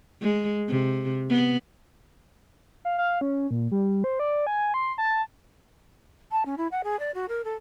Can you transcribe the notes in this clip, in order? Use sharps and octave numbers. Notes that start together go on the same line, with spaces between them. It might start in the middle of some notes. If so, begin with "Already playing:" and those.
G#3
C3
B3
F5
F5
C#4
A#2
G3
C5
D5
G#5
C6
A5
A5
C#4
E4
F#5
G#4
D5
F#4
A#4
A4